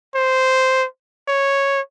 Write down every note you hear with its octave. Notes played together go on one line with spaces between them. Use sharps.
C5
C#5